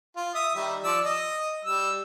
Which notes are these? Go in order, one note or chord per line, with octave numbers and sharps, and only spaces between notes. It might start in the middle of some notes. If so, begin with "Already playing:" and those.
F4
E5 D#6
D#3 G3 E5
F3 D5 E6
D#5
G3 E6